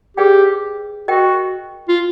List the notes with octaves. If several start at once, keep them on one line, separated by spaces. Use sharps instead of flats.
G4 G#4 B4 D5 G5
F#4 A#4 D#5 G5
F4